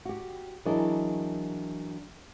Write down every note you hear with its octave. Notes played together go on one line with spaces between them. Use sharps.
F#4 G4
E3 F#3 D4 G#4 A#4 D#5